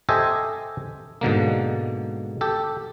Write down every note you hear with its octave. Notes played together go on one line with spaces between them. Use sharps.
G4 A4 C5 D#5 E5 G#5
G#2 B2 D3 A#3
G4 A4